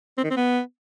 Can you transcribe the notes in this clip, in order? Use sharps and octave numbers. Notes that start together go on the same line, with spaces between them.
C4
D#3
C4
B3